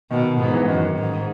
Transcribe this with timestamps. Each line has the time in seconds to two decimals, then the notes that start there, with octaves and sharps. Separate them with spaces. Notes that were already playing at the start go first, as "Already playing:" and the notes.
0.11 B2 D#3
0.40 G#2 B3
0.54 E3
0.68 F#2 D#3
0.98 G#2